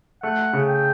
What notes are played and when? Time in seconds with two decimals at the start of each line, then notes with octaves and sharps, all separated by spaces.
0.23 A3 F#5
0.53 C#3
0.68 G5